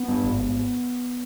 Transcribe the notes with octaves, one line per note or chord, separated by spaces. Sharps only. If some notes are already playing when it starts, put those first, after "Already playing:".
Already playing: B3
G2
G#1
G#1